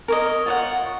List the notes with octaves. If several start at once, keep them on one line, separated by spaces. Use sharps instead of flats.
A#4 C#5 D#5
F4 C#5 F#5